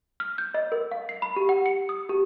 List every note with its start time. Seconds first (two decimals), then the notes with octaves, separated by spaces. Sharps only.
0.20 F6
0.38 G6
0.54 D#5
0.72 A#4
0.91 F5
1.09 C7
1.22 B5
1.36 G4
1.49 F#5
1.66 C#7
1.89 D#6
2.09 G4